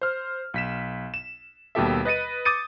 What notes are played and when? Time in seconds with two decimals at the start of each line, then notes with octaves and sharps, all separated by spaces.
0.01 C5 F6
0.54 B1 B6 E7
1.14 E7
1.75 D#2 B2 G3 G4 A4 E5
2.05 B4 D#5 A6 C#7 D#7
2.45 D6 D#6 G6 A6 C#7 D#7